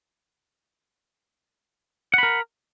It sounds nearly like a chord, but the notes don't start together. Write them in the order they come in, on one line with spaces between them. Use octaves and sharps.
F#5 B5 A#4